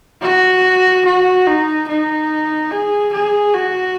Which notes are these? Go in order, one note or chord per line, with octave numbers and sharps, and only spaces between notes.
F#4
F#4
D#4
D#4
G#4
G#4
F#4